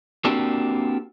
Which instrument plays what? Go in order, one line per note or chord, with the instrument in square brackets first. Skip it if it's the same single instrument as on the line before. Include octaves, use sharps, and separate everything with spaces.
[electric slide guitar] A#3 C4 D4 F#4 G4